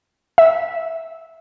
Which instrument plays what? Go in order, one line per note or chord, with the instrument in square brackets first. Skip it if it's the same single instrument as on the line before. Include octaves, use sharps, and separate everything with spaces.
[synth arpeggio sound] E5